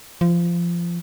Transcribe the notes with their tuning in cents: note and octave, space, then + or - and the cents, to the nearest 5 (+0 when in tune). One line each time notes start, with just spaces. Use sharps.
F3 -20